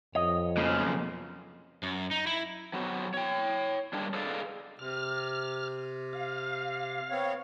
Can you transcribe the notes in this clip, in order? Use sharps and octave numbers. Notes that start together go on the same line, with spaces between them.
F2 C#5 D#5
B1 C#3 F3 A#3 C4
F#2
D#4
E4
F#3 B3 C4 F#4
C#5 G5
G3 G#3 A#3 D4
G#4 A4 B4 D5 D#5 F5
C3 F6
F5
B3 C4 C#5